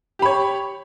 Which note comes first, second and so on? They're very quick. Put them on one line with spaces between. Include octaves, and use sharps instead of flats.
G4 B5 C#5